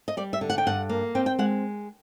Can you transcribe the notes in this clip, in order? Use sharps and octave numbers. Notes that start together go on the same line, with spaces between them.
D#5
G3 D5
E5
D3
F#5
G5
G2 F#5
A#3
C4 G5
G5
G#3 F#5